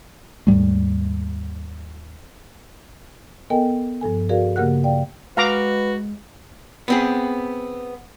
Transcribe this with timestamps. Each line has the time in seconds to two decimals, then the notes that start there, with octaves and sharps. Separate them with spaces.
0.47 D#2 G#2 G3 A3
3.50 B3 A4 A#4 D#5 G5 G#5
4.01 G2 F3 A4 G#5
4.29 F#4 G#4 A#4 D5 F5
4.56 C#3 A#3 G4 A#4 F#5 F#6
4.84 D5 F5 G5
5.37 G#3 F#4 B4 F5 A#5 D6
6.88 B3 C4 G#4